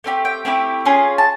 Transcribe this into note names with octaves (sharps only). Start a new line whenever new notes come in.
A3 C4 E4 G4
G5
A3 C4 E4 G4
C#4 F4 G#4
A5